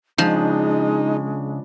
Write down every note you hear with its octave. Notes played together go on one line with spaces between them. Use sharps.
C#3 F3 G#3 D4 D#4 F#5